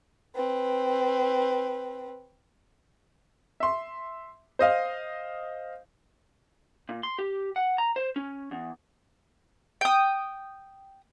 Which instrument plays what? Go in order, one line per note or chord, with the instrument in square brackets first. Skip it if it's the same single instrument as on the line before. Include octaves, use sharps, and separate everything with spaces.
[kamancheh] C4 B4
[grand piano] E5 C6
C5 D#5 F5
[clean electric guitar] A#2
C6
G4
F#5
A#5
C5
C#4
E2
[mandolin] G5 D#6